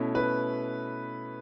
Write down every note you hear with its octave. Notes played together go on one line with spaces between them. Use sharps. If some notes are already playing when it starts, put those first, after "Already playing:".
Already playing: B2 A3 C#4 E4
B4